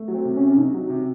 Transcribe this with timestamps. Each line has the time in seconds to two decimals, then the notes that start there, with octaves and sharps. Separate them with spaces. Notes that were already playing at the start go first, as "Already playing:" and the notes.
Already playing: A3
0.08 F#3
0.14 C4
0.25 C3
0.36 C#4
0.41 C3
0.50 C#4
0.58 C3 D#4
0.74 F#3
0.90 C3